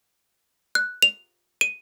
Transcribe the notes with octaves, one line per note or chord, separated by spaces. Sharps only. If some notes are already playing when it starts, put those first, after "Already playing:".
F#6
F7
D#7